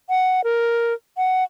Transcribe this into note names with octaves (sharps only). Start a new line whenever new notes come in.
F#5
A#4
F#5